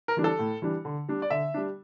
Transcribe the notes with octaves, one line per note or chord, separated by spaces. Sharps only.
A#4
E3 G3 D4
A4
A2
E3 G3 D4
D3
G3 D4
D5
D3 E5
G3 D4